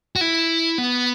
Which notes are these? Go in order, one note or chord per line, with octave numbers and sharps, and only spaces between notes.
F#4
E4
B3